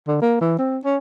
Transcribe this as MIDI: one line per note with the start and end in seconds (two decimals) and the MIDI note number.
0.07 0.20 50
0.22 0.38 58
0.41 0.58 52
0.58 0.78 60
0.84 0.97 61